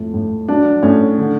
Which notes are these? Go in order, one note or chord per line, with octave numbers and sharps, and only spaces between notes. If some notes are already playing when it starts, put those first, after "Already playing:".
Already playing: F2 A2
A2
F#3 D4
A2 C#4
D3